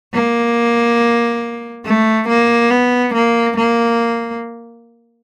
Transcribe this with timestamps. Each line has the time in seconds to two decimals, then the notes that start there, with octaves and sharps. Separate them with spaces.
0.14 A#3
1.86 A3
2.29 A#3
2.71 B3
3.14 A#3
3.57 A#3